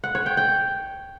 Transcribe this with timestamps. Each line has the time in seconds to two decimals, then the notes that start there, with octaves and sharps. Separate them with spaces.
0.04 F#5
0.15 C#5
0.26 G5
0.37 G5